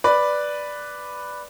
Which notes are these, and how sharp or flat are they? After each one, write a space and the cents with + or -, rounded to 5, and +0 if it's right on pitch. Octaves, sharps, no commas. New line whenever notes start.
B4 +0 D5 +0